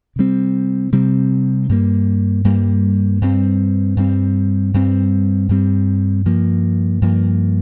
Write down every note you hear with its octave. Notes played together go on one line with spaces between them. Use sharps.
C3 G3 C4
C3 G3 C4
G2 G3 A#3
G2 G3 A#3
G2 G3 C4
G2 G3 C4
G2 G3 C4
G2 G3 C4
G2 F3 A#3
G2 F3 A#3